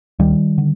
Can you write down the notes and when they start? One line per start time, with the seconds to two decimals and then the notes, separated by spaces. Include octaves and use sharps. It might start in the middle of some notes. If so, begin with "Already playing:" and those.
0.19 D2 D#3 G3
0.58 D3